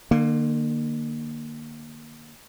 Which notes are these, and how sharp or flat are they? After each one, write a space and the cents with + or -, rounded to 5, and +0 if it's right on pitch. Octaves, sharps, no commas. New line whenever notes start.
D3 +45 A#3 +0